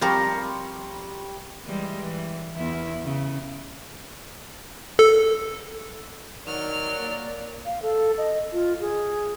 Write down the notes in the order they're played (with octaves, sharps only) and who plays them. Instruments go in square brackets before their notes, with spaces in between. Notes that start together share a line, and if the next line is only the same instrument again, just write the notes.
[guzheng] F3 C4 A#4 [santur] G3 C6 C#6
[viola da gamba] E3 G3 G#3
E3
E2 E4
C#3
[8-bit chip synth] A4
[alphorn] D#3 [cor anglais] F#3 [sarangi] D5 [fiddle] F6
[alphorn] A#3
[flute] F5
A4
D#5
F4
G#4